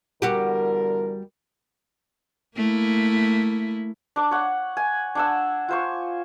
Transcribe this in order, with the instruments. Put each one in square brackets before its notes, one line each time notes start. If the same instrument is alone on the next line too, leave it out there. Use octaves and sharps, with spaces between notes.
[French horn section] E2 D3 A#4 [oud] G3 F#4 G4
[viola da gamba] A3 A#3 E4
[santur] D4 D6
C#5 F#5
G#5
D4 F#5 E6
F4 C5 C#6